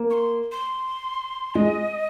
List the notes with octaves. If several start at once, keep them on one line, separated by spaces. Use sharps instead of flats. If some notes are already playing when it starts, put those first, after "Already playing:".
Already playing: A#3
C#6
C6
C6
G#3 D#5